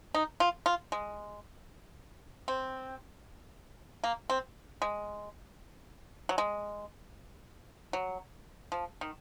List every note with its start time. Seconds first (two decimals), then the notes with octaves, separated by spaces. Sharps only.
0.15 D#4
0.40 F4
0.66 F4
0.92 G#3
2.48 C4
4.04 A#3
4.30 C4
4.82 G#3
6.29 F#3
6.38 G#3
7.93 F#3
8.72 F3
9.01 D#3